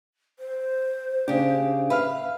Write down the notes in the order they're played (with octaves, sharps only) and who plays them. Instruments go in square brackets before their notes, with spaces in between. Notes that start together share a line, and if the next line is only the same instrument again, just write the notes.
[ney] C5
[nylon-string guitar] C#3 G4 [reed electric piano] D4
[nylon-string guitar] B4 [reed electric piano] E5 F5 F6